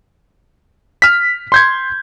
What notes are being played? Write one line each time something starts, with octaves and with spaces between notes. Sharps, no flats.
F6 B6
C6 G6 G#6